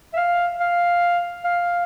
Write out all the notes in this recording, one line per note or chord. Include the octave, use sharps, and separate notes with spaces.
E5
F5
F5
F5